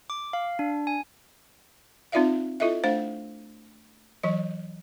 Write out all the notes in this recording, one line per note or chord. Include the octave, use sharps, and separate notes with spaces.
D6
F5
D4
G#5
C4 D#4 F4 D5 E5 F5
E4 F4 A4 D#5 E5
A3 D4 C5 F5
E3 F#3 D#5